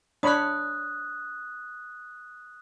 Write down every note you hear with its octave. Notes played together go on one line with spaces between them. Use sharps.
D4 C#5 B5 D#6 F#6